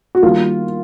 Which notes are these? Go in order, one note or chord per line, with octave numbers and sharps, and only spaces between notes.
F#4
D#3 G3 A#3 F4